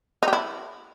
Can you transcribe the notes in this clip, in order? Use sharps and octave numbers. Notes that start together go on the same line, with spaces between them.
D#4
G4
E4